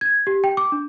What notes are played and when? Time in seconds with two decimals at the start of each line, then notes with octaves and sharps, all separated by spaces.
0.01 G#6
0.27 G4
0.44 G5
0.57 D6
0.72 D4